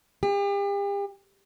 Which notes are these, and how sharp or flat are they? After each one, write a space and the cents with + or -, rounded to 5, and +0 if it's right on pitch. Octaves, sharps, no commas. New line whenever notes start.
G4 +40